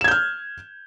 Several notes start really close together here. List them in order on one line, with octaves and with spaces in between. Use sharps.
E7 G#6 G6 F6